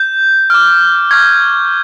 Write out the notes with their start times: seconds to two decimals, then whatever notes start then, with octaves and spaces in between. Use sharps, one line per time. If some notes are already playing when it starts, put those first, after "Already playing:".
Already playing: G6
0.50 D6 F6
1.11 C#6 F6 G#6